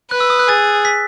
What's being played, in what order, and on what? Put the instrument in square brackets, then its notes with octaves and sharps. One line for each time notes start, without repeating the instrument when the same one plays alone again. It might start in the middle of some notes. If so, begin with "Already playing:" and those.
[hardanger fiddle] B4 [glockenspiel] F#6
[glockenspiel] E6
D#6
F#6
[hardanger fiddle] G#4 [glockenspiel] A6
[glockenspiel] B6